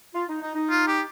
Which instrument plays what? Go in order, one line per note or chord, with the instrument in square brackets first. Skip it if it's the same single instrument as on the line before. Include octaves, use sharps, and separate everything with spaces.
[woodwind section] F4
D#4
D#4
D#4
[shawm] F4
G4